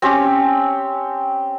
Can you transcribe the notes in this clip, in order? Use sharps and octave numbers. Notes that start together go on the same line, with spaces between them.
C4 C#4 G4